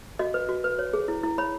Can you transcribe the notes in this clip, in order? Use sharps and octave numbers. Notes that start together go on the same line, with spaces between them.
F#4 D#5
B4
F#4
B4
C#5
G#4
E4
E4
C#5 B5